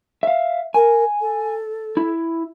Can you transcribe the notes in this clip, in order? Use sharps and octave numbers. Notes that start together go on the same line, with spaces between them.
E5 F5
A#4 G#5
A4
E4